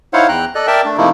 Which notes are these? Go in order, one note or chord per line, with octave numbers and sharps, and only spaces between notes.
D#4 E4 C5 C#5 F5 F#5
E2 G5 A#5 F#6
A4 D5 D#5 F#6
A#4 D5 E5 G5 A5
A3 D4
C3 F3 A3 A#3 D#4 E4